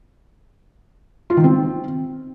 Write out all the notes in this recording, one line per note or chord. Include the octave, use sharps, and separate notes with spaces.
F4
D#3
C4